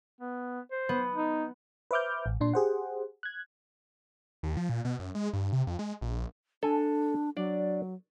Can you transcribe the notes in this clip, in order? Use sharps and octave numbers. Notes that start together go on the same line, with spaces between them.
B3
C5
B3
D#4
B4 C5 E5 D6 F6 G6
A1
A#2 D4 C6
G4 G#4 C5 F#5
F#6 G#6
D#2
F3
A#2
B2
F#2
G#3
G2
C3
F2
G#3
A#1
D4 A4 G#5
F#3 D4 D5